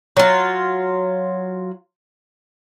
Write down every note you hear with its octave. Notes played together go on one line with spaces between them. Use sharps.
F#3 F4